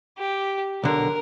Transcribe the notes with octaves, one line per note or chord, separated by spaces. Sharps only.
G4
B1 D3 A#4